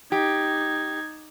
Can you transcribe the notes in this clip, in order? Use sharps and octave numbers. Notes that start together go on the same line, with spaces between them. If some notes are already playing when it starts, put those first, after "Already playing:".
D#4 G4 G#6